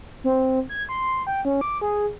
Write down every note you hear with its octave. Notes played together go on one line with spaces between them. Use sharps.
C4
G#6
C6
G5
C#4
D6
G#4